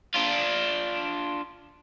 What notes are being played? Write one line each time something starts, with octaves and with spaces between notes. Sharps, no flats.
D4 F4